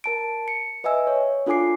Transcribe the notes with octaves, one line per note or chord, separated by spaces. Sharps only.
A#4 A5 D7
C#7
B4 D#5 E5 G#5 E6
C#5
D4 F4 A4 G#5 D6 C7